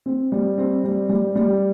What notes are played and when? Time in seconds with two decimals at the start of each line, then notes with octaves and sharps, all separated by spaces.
0.06 C4
0.32 G3
0.58 C4
0.84 G3
1.09 G3
1.36 G3